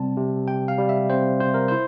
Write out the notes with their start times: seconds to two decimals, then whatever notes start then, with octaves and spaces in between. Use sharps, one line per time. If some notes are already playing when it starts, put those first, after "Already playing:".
Already playing: C3 G3 C4 A5
0.17 C3
0.48 C3 G5
0.68 F5
0.78 G3
0.89 E5
1.10 C4 C5
1.40 C3 C5
1.54 A#4
1.68 E4 C5